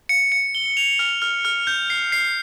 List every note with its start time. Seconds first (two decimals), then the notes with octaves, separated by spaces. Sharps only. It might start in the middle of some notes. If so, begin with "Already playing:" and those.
0.09 C#7
0.32 C#7
0.55 G7
0.77 F7
0.99 F6
1.22 F6
1.45 F6
1.67 G6
1.90 C7
2.12 C7